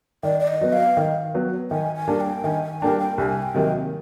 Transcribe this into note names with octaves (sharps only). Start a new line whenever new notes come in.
D#3 D5
D5
D#5
F#3 B3
F5
D#3
F#3 B3
D#3 G#5
G#5
G3 A#3 D4
G5
D#3 G#5
G#5
G3 A#3 D4 G5
G5
C2 G#5
G5
C3 D#3 F#3 A#3